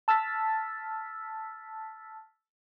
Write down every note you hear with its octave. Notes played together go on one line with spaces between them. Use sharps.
A5 E6 F6 A6 B6